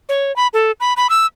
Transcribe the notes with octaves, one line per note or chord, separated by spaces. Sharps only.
C#5
B5
A4
B5
B5
E6